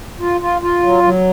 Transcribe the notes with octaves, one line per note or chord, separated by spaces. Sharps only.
F4
F4
F4
F#3
F#3